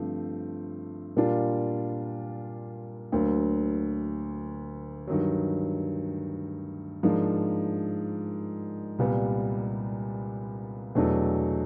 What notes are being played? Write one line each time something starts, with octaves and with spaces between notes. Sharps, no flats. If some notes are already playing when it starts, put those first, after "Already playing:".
Already playing: G2 D3 F3 A3 C4
A#2 G3 A#3 D4 F4
D2 D3 F#3 A#3
G2 D#3 F#3
G#2 F3 A#3 D4
C2 A#2 G3 B3
E2 B2 F#3 A3 D4